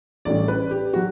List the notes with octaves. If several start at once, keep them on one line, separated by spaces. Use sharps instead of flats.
A1 A2 G3 C#4 D5
B4
G4
F#3 F#4